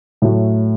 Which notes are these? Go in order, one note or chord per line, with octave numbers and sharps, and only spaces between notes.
A2 F#3 A3